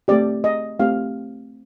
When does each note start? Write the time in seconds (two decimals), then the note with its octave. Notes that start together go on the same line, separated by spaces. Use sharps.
0.08 A3 C4 G4 D5
0.44 D#5
0.80 A3 C4 G4 F5